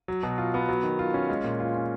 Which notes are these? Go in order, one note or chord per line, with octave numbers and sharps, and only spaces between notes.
F#3
B2
F4
B3
F#3
D#3
F4
C#4
G#3
A#2
F4
C#4